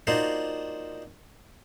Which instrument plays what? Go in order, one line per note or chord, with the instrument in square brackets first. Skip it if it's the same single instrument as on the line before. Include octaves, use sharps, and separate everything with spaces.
[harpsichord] A#3 D4 D#4 F4 F#4 C5